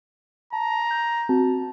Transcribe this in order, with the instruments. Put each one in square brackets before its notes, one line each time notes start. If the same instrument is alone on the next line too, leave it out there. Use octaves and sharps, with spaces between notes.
[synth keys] A5 [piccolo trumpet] A#5
[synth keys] G6
C4 F#4 A5